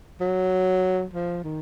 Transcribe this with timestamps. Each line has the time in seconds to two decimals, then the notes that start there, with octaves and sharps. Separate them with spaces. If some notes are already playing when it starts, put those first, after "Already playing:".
0.20 F#3
1.13 F3
1.44 D#3